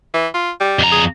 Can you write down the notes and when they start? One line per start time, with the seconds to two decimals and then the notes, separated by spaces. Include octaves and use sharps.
0.14 E3
0.34 F4
0.60 G3
0.79 F2 A#5
0.92 G#4